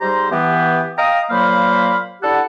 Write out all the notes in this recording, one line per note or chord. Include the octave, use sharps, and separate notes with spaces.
G#2 G3 G4 C5 A#5 C6
E3 B3 G4
D#5 F5 G5 A#5 D#6
A#2 F#3 A#3 C5 F5 B5
D4 E4 G4 A4 F#5